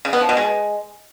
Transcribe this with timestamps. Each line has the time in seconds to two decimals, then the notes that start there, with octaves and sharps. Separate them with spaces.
0.05 C#3
0.13 B3
0.21 F3
0.29 B2
0.37 G#3